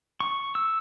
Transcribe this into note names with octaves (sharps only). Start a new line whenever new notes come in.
C#6
E6